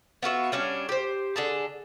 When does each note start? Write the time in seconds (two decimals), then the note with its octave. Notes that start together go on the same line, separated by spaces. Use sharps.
0.23 B3 F4 F#4 E5
0.52 G3 C#4 D4 F5
0.89 G4 C5
1.36 D3 G#4 A5